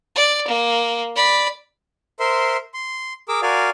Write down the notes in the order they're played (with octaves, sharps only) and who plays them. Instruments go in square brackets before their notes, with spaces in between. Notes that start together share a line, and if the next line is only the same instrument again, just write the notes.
[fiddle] D5
A#3
D5 B5
[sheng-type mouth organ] A#4 C5 E5 C6
C6
G#4 A#4 D6 E6
F#4 A#4 D5 F5 G#5